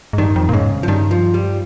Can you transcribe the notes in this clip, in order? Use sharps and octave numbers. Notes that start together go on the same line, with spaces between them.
G#2
G2 D#3
F2
A#2
G#2 C#3
F3
G2 D#3
F3
G3